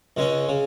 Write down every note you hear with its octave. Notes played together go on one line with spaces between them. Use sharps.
C#2 C#3 G#3 C#4
C#3